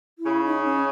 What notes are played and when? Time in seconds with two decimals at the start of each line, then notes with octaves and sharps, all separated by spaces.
0.19 E4
0.25 C#3
0.44 D#4
0.63 C#4